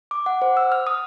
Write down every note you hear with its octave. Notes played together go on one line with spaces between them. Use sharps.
D6
F#5
C5
E6
F6
D#6